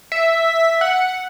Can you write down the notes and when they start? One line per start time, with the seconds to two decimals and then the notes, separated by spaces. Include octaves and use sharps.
0.12 E5
0.81 F#5